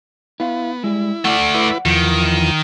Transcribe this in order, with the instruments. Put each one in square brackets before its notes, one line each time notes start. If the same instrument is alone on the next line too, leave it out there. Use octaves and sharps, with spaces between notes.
[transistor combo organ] B3 [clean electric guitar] E4 F5
[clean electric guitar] G3 G#3 [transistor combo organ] E4
[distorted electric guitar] A3 D5 [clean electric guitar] F#5
[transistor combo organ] E4 B4
[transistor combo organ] E2 F3 [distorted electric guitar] D#3